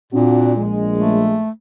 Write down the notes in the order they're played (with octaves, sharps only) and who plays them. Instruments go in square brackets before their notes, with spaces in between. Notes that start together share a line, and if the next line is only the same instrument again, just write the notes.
[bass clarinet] A#2 [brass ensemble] C4 D4 F#4
[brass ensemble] A#1 G#3
[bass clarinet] A3